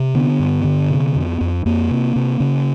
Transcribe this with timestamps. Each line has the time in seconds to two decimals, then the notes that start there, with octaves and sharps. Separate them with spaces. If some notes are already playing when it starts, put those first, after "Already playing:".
Already playing: C3
0.15 D3 B3
0.40 G2
0.64 D3
0.90 C3
1.16 F2
1.41 F2
1.66 F2 A#3
1.91 C3
2.16 C3
2.40 C#3